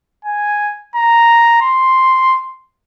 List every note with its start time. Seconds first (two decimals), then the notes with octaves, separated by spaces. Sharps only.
0.25 G#5
0.96 A#5
1.62 C6